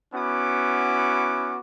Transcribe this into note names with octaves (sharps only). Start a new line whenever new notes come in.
B3 C#4 E4 F#4 D6